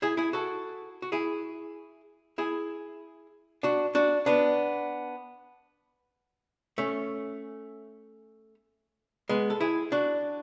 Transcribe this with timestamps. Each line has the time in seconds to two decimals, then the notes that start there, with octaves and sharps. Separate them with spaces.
0.02 E4 G#4
0.17 E4 G#4
0.33 F#4 A4
1.02 F#4
1.12 E4 G#4
2.38 E4 G#4
3.63 D4 F#4
3.95 D4 F#4
4.26 B3 D4
6.78 A3 C#4
9.29 G#3 B3
9.50 A4
9.60 E4 G#4
9.92 D4 F#4